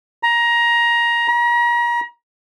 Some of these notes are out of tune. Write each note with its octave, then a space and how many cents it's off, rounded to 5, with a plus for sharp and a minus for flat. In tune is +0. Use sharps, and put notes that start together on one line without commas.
A#5 +15
A#5 +35